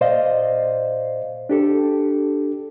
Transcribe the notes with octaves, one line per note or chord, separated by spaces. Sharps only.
A#2 C5 D5 D#5 F5
D4 G4 A4